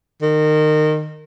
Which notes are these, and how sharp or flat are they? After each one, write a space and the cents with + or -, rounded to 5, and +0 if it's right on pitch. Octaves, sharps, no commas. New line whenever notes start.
D#3 -25